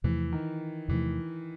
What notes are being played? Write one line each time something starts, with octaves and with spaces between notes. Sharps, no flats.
E2 C3 E3 F3 A3
D#3
E2 C3 E3 F3 A3